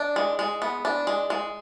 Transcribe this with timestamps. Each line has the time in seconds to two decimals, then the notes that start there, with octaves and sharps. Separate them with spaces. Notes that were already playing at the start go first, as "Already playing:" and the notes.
Already playing: D4
0.16 G#3
0.39 G#3
0.62 B3
0.85 D4
1.07 G#3
1.30 G#3